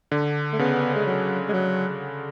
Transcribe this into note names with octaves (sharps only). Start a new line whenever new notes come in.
D3
A3
C#3 B3
G#3
F#3
G#3
F#3